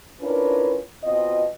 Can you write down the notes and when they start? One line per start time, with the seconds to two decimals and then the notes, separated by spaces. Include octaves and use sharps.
0.20 C#4 D4 E4 F4 A#4 B4
1.03 B2 C4 F4 D#5